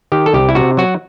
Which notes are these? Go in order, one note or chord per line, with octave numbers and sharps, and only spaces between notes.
D#3 G4
A4
C2 G4
E4
C3 F#4
F#3 F#4